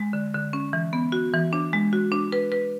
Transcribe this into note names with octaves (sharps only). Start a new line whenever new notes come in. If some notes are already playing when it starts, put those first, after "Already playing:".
Already playing: G#3
D3
D3
C#4
E3
B3
F#4
E3
D4
G#3
F#4
D4
B4
B4